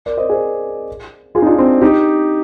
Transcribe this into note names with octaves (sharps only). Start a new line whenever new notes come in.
A#4 D5
C5 D#5
G#4 C5
F4 G#4
D#4
D4 F4
C4 D#4
D#4 G4